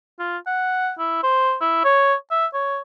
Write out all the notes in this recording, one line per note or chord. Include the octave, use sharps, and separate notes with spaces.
F4
F#5
E4
C5
E4
C#5
E5
C#5